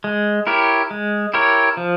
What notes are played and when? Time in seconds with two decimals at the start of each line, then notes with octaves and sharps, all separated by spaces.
0.04 G#3
0.47 E4 G4 A#4 C#5
0.91 G#3
1.34 E4 G4 A#4 C#5
1.77 F3